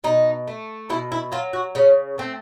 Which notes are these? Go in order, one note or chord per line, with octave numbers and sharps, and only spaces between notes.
B2 D#4
A3
B2 E4
E4
F#3 F4
F#4
C#3 C#4
A3 C4